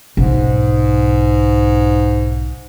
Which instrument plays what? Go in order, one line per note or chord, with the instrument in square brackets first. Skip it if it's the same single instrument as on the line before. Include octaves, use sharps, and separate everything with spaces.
[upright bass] B1 [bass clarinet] G#2